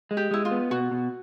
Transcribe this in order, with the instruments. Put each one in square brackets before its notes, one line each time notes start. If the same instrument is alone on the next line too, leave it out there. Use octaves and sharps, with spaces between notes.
[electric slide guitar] G#3
[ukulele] G4
[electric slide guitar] G#3 [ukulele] E4
[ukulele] F4
[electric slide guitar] B3
[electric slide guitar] B2 [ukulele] F#4
[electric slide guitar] B2